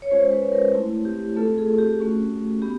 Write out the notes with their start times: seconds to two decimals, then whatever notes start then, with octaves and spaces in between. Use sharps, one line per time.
0.02 C#5
0.11 G#3 C#4 F4 C5
0.32 B4
0.53 A#4
0.74 A3 C4 E4
1.05 G4
1.36 A3 C4 F4 A4
1.58 G#4
1.79 G4
1.99 A3 C#4 F#4
2.62 B3 G4